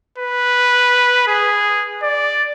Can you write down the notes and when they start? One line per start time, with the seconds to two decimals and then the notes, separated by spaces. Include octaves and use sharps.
0.18 B4
1.28 G#4
2.03 D5